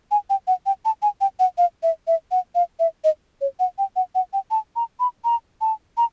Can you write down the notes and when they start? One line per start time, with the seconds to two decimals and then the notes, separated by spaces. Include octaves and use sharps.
0.11 G#5
0.30 G5
0.47 F#5
0.66 G5
0.85 A5
1.02 G#5
1.21 G5
1.39 F#5
1.58 F5
1.83 E5
2.07 E5
2.31 F#5
2.55 F5
2.79 E5
3.04 D#5
3.41 C#5
3.60 F#5
3.78 G5
3.96 F#5
4.15 F#5
4.33 G5
4.51 A5
4.76 A#5
5.00 B5
5.24 A#5
5.61 A5
5.97 A#5